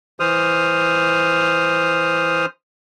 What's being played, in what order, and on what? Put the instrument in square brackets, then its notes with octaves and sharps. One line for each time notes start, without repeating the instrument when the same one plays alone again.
[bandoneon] E3 C5 D#6 F6